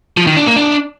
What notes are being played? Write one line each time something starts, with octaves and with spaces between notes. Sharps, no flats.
F3
D#3
D4
A#3
D4